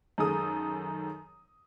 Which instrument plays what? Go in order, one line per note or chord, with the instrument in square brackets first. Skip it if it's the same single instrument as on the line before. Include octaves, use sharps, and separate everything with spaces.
[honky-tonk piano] F#2 D#3 G#3 A4 D#6